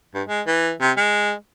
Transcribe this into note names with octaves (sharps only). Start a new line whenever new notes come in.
G2
G#3
E3
C3
G#3